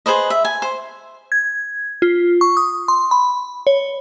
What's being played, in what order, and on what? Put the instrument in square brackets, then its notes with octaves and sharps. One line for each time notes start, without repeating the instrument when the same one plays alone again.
[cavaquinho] G#4 B4 C5 D#5
E5
G#5
C5
[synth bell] G#6
F4
C#6
D#6
C6
B5
C#5